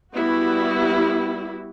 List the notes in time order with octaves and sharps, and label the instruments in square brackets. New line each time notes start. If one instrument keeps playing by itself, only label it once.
[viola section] G3 B3 E4 F#4